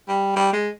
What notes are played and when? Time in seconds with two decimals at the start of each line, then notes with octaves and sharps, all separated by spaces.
0.08 G3
0.36 G3
0.53 G#3